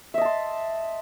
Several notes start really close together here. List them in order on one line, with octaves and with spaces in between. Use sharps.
E5 D#5 A5 C6